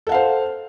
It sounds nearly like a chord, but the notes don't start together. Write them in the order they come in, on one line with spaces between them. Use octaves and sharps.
A4 F#5 F5 C5